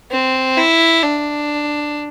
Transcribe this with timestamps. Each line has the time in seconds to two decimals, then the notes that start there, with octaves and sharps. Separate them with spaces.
0.12 C4
0.58 E4
1.03 D4